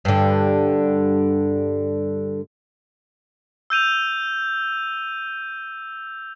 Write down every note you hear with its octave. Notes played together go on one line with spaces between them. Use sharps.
G2 D3
E6 G6 D#7 F7